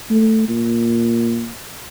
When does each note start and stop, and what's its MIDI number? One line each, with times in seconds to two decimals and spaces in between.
0.10 0.47 57
0.48 1.49 46